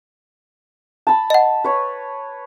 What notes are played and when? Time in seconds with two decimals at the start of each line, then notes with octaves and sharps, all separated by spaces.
1.07 A5 B5
1.30 D#5 F#5
1.64 B4 C#5